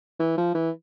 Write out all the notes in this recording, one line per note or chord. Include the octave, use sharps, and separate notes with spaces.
E3
F3
E3